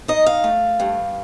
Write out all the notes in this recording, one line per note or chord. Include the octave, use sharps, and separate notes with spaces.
D#4 D#5
F5
A3
G2